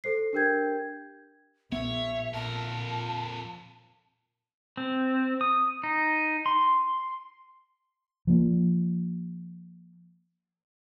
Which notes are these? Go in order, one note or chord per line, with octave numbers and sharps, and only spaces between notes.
A4 C5 C7
D4 G4 A#4 G5 G6 G#6
A#1 B3 C#5 E5
F2 A#2 A#4 A5
C4
D#6
D#4
C6
F3 A#3